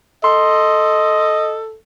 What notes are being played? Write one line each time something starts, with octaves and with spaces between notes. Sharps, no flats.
A4 D#5 C6